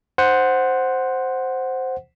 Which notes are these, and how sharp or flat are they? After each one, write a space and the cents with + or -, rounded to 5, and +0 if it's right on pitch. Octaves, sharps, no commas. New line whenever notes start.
C5 +0 F#5 +0